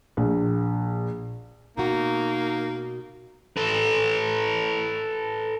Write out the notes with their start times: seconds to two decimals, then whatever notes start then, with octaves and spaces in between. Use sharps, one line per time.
0.17 A#1
1.77 B2 A#3 D#4 F#4
3.57 A4 B4